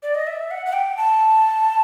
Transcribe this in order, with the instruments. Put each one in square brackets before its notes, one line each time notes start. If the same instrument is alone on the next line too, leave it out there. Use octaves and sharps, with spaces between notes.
[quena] D5
D#5
E5
F#5
F#5
G5
A5